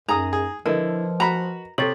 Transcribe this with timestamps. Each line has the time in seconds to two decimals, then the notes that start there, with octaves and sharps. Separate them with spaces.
0.09 F#2 D#4 G#4 A#5 D#6
0.33 G#4
0.66 D3 F3 E4 A#4 B4 D#5
1.20 F#4 A#5 B5
1.78 C3 A4 C#5 A6 F#7